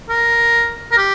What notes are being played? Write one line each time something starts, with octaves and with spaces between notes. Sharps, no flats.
A#4
A#4
G4